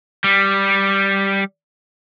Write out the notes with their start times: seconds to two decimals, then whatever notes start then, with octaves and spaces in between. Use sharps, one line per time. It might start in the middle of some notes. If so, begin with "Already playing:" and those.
0.24 G3